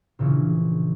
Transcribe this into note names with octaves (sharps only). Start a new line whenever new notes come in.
A#1 C#3 E3 F3